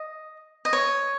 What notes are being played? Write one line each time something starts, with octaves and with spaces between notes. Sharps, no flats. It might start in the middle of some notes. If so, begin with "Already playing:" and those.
Already playing: D#5
D#5
C#5